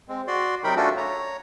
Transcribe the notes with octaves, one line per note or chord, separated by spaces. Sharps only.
G#3 C4
F#4 D5 C6
C3 F#3 D#4 A#4 G5 B5
A3 C#4 D4 F4 F#4 A4
C#5 A#5